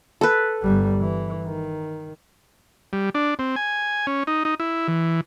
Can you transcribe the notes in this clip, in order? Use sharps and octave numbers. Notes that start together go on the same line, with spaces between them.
A4 B4
G1 G3
E3
D#3
G3
D4
C4
G#5
C#4
D#4
D#4
E4
E3